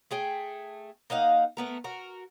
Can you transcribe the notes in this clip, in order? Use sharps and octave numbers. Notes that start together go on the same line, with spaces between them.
A3 G#4 G5
A#3 D#4 F5 F#5
A3 B3 A#4
F#4 A#4